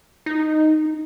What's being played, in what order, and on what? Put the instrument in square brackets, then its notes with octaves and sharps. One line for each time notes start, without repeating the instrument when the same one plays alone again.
[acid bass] D#4